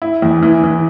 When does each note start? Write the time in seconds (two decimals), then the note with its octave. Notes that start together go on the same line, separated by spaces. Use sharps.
0.02 E4
0.22 E2
0.42 E3
0.64 E3